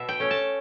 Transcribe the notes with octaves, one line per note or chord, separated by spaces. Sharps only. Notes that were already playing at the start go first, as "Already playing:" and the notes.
Already playing: B2 E5
G5
A3 C#4
A5